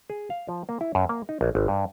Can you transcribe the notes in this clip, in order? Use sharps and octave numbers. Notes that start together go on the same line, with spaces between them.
G#4
F5
F3
A#3
E4
F#2
A#3
D#4
A#1
G#1
G2